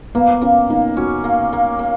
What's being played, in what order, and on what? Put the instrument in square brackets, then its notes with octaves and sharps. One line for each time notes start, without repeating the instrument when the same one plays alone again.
[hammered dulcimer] A#3 [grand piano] B3
[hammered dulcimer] A#3 [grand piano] C#4
[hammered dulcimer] A#3 [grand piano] D#4
[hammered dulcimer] C#4 [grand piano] F#4
[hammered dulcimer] A#3
A#3
A#3